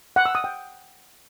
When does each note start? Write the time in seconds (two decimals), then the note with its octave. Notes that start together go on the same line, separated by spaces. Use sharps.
0.16 F#5
0.26 E6
0.35 D#6
0.44 G5